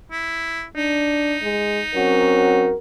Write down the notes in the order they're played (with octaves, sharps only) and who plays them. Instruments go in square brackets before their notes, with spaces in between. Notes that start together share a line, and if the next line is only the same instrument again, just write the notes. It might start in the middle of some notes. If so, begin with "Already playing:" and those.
[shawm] E4
[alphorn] D4 [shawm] D#4
[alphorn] G#3
[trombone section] F#3 C4 F#4 [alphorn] C#4 [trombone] A#4